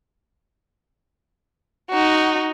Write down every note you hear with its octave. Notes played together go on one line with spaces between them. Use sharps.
D#4 F#4